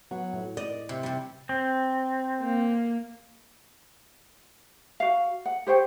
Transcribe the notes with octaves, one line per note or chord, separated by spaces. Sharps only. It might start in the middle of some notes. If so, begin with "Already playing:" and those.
F#3 B3
A2
D5 D#5
C3
C3 G3
C4
A#3
F#4 F5
F#5
G4 C5 C#5 G5